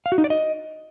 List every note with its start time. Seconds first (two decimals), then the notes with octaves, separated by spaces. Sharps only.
0.06 F5
0.12 F#4
0.18 D#4
0.24 D5
0.30 D#5